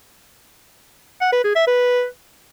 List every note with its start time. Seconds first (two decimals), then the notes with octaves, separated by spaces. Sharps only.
1.21 F#5
1.33 B4
1.44 G#4
1.56 E5
1.67 B4